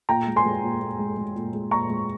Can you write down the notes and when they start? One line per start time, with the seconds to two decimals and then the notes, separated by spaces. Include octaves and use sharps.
0.09 A#2 G5 A#5
0.27 G#3
0.36 G#5 C6
0.45 G#3
0.63 A#2
0.81 A#2
0.99 G#3
1.17 G#3
1.36 A#2
1.54 G#3
1.71 A#2 A#5 C#6
1.90 G#3